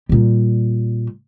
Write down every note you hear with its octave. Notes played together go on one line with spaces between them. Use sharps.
A#2 G3